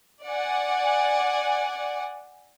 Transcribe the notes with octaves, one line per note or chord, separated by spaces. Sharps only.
D5 F#5 G#5